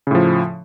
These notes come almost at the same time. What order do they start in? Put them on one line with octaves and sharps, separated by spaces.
C#3 A2 F3